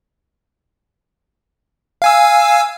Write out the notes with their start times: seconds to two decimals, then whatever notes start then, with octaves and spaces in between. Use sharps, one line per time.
2.02 F5 G#5 E6